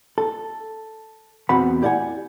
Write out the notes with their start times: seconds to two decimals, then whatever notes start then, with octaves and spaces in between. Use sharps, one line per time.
0.18 A4
1.49 E2 B2 C4 F#5 B5
1.82 E4 G4 D5 F5 F#5 G#5